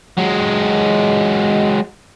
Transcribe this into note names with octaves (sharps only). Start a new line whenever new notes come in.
F#3 G#3